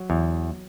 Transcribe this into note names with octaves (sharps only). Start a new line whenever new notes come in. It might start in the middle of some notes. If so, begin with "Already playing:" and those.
Already playing: F#3
E2